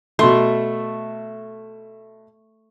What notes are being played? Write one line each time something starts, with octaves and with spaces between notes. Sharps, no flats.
B2 A3 C6